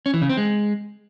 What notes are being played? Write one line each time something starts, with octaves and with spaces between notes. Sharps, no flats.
C#4
E3
C#3
C4
G#3